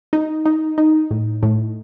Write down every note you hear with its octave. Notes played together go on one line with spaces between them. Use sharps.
D#4
D#4
D#4
A2
A2